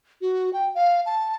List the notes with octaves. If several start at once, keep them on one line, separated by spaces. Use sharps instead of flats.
F#4
G5
F5
A5